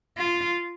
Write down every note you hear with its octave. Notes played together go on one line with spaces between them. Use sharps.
F4